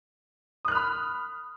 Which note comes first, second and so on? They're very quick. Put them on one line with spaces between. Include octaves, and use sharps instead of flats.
D#6 F#6 F6 B5